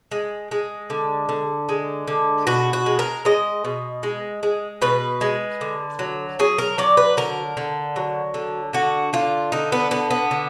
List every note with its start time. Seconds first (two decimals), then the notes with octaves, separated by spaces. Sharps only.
0.11 G#3
0.51 G#3
0.90 D3
1.29 D3
1.69 G#3
2.08 D3
2.47 B2 F#4
2.73 F#4
2.86 G#3
2.99 A#4
3.25 G#3 D#5
3.65 B2
4.03 G#3
4.43 G#3
4.82 B2 B4
5.21 G#3
5.61 D3
5.99 F#3
6.39 F#3 G#4
6.58 A#4
6.78 F#3 D5
6.97 B4
7.17 D3 A#4
7.57 D3
7.96 F#3
8.34 D3
8.73 D3 F#4
9.13 D3 F4
9.52 D3 D#4
9.72 B3
9.91 D3 B3
10.11 B3
10.31 D3